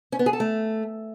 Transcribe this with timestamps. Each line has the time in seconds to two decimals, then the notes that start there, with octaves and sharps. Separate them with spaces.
0.12 C#4
0.19 B3
0.26 G#4
0.33 A4
0.40 A3